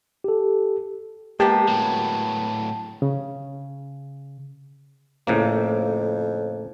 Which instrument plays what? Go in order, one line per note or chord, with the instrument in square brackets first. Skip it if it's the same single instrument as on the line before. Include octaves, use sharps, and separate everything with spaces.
[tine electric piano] G4 A4
[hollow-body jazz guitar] G#3 A#3 B3 [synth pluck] G4 [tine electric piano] G5 A5
[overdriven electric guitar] A2 F#3
[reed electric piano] C#3
[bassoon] F2 [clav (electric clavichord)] A2 C#3 A#3